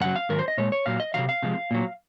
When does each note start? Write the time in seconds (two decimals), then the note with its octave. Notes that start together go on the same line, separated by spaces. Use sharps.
0.01 F#2 C#3 F#3 F#5
0.16 F5
0.29 G#2 D#3 F#3 A#4
0.39 C5
0.48 D#5
0.58 A#2 G#3 C#5
0.72 C#5
0.86 A#2 F#3 F5
1.00 D#5
1.14 C3 D#3 F#3 F5
1.29 F5
1.43 C3 F3 G#3
1.71 A#2 F#3